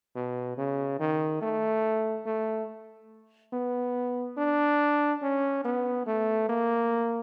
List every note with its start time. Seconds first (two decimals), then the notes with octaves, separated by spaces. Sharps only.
0.15 B2
0.57 C#3
1.00 D#3
1.42 A3
2.26 A3
3.53 B3
4.38 D4
5.22 C#4
5.65 B3
6.06 A3
6.49 A#3